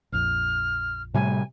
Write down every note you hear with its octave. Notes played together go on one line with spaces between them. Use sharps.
A#1 F2 F6
A2 C3 G3 G#5